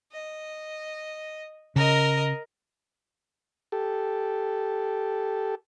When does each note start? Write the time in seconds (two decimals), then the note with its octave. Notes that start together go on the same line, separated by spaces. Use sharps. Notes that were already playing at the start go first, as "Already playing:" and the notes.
0.12 D#5
1.76 C#3 A#4 D#5
3.72 G4 A4